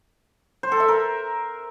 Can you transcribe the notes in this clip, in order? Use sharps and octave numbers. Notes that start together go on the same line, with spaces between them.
C5
A4
E5
A#4